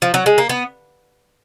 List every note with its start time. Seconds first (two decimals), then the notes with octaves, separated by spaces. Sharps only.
0.02 F3
0.14 F#3
0.26 G#3
0.38 A#3
0.49 B3